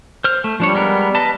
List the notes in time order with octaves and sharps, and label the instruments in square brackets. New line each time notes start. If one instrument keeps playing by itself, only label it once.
[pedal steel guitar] C5 F6
A3
[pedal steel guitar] F3 D4 C#5 [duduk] G3
[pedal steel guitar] G#3 B3 A#4
B4 D#5 A5